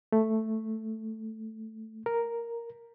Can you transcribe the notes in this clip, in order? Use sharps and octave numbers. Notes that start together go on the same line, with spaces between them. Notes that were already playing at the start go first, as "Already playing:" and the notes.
A3
A#4